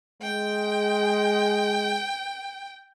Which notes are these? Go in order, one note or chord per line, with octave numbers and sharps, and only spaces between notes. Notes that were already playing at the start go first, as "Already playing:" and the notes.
G#3 G5